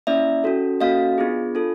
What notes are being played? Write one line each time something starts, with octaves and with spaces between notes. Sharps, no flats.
A#3 C#4 E4 D5 E5
C#4 F#4 A4
A#3 C#4 F#4 A4 D#5 F5
B3 D4 F4 G#4
D4 F4 A4